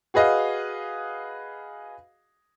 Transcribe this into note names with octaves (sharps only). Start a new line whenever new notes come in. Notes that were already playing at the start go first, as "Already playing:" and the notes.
F#4 G#4 B4 D#5 F5